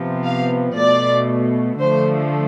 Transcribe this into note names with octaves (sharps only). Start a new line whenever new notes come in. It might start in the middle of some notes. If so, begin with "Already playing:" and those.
Already playing: C3 F3 B3
F5
B2 A3 D5
D3 F3 A3 C5